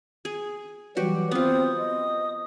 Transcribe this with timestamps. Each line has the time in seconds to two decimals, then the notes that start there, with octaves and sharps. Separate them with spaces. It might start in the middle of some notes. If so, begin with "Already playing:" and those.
0.25 G#4
0.97 E3 F#3 G3 F#4 G4
1.31 B3 C4 F4 D#6
1.78 D#5